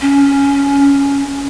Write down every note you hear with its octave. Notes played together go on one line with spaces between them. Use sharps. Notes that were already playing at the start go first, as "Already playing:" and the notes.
C#4